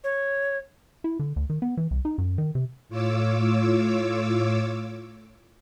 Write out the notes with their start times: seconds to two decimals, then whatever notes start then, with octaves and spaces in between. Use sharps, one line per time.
0.04 C#5
1.04 E4
1.19 D3
1.36 D2
1.50 D#3
1.62 B3
1.77 E3
1.91 C2
2.05 D#4
2.18 F#2
2.38 D#3
2.55 C3
2.89 A2 F4 C#5 D6 E6